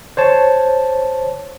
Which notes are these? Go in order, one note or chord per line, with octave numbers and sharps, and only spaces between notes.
C5 C#5 A5